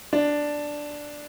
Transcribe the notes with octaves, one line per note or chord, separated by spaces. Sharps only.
D4